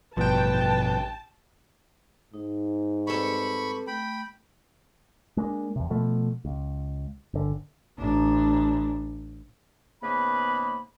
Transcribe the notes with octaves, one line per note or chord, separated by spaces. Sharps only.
A1 G2 B2 F3 B4 G5 A5
G#2 D#4
G3 C4 A4 B4 B5 C#6
A3 G5 B5
G#3 A#3 C#4 D4
E2 C3
B2 F3 A3
C#2
G1 D3
A1 D4
G#2 C#3 A#3 B3 B4 B5